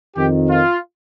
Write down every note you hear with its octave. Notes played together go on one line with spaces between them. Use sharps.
F2 D#3 G4
F4